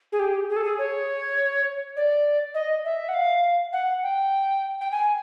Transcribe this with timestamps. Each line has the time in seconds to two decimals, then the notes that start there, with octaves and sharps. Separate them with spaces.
0.12 G#4
0.19 G4
0.49 G#4
0.56 A4
0.64 G#4
0.78 C#5
1.97 D5
2.54 D#5
2.85 E5
3.09 F#5
3.14 F5
3.73 F#5
4.03 G5
4.81 G5
4.92 G#5